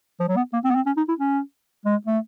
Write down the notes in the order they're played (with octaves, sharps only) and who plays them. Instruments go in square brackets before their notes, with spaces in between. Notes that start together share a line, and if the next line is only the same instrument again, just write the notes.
[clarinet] F3
F#3
B3
A#3
C4
B3
C4
C#4
D#4
E4
C#4
G#3
A3